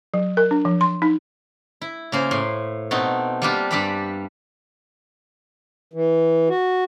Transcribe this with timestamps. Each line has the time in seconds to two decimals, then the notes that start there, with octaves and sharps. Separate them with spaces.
0.14 F#3
0.37 A#4
0.51 D4
0.65 F3
0.81 C6
1.02 D#4
1.81 E4
2.12 C#3 A#3 C5
2.31 A2 C6
2.91 B2 A3 C4 D#4
3.42 G3 A#3 D4 F4 G4
3.71 G2 G3 G4 D5 E5 B5
5.93 E3
6.50 F#4